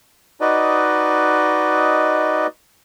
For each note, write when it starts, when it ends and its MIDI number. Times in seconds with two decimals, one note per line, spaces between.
0.41 2.47 63
0.41 2.47 66
0.41 2.47 71
0.41 2.47 74
0.41 2.47 75